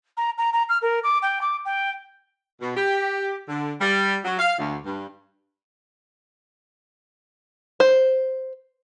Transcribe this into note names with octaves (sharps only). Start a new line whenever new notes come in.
A#5
A#5
A#5
F6
A#4
D6
G5
D6
G5
B2
G4
D3
G3
F#3
F5
D2
G2
C5